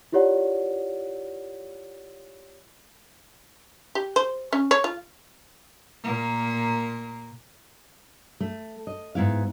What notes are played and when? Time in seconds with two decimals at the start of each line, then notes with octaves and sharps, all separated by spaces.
0.12 E4 F4 G4 C#5 D5 F#5
3.95 G4
4.16 C5
4.53 C#4
4.71 C#5
4.84 F4
6.04 A#2 A#3
8.40 A3
8.87 D#5
9.15 G#2 B3 E4 F5